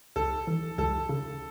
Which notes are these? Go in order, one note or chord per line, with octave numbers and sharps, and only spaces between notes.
C#2 A4
E3
C#2 A4
C#3